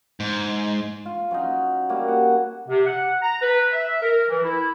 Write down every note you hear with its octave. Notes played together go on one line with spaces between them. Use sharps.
G#2
F4
F#3 C#4 D#4
G3 A#3 F#4
F#5
C3
F#5
A#5
B4
E5
A#4
E3
E4